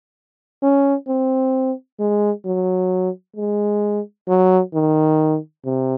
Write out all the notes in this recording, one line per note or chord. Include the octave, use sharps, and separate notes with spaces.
C#4
C4
G#3
F#3
G#3
F#3
D#3
C3